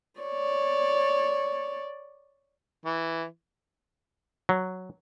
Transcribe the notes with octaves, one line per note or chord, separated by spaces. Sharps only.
C#5 D5
E3
F#3